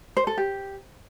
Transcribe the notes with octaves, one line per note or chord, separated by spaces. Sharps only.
C5
A4
G4